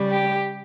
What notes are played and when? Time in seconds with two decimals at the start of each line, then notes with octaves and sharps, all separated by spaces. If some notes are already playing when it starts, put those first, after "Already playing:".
Already playing: C#3 G3
0.12 G4